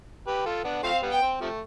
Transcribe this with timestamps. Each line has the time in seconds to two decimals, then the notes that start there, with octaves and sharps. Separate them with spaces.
0.27 G4 B4
0.45 F4 A4
0.64 B3 D4
0.83 F3 A3 C4 F5
1.02 G3 B3
1.12 G5
1.22 C4
1.41 C3 F3 A3